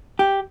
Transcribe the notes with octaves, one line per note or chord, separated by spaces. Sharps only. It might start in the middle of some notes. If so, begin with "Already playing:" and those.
G4